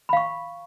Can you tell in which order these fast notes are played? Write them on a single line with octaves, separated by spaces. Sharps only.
B5 F5 C#6